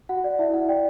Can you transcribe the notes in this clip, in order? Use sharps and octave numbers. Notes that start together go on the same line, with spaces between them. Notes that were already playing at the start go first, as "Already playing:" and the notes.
F#4 F#5
D5
E4 E5
E4 F#5
D5 G5